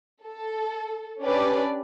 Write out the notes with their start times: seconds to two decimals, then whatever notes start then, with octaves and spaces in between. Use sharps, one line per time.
0.25 A4
1.22 C#4 D4 G4 B4 D5